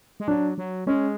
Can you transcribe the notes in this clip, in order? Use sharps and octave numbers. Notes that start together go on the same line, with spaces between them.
G#3
F#3 D4
F#3
G#3 C#4